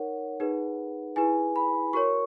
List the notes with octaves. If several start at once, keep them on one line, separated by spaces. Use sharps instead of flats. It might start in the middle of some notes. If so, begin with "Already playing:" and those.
Already playing: D#4 A#4 C#5 F#5
D#4 G#4 B4
E4 G#4 B4 G#5
B5
F#4 A#4 C#5 C#6